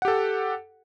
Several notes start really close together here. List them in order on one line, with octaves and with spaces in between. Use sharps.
F#5 G4 A4